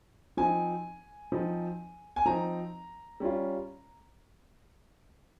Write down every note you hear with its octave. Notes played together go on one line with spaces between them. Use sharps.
F3 C4 D#4 G#5
F3 C4 D#4
G#5
F3 C4 D#4 A#5
G3 C#4 F4